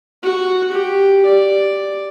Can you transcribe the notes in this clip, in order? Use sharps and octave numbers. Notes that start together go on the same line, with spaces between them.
F#4
G4
D5